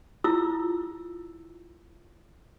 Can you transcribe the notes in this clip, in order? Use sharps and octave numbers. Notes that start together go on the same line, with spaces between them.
E4 F4 E6